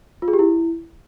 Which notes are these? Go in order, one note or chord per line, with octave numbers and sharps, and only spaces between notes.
F4
G#4
G4
E4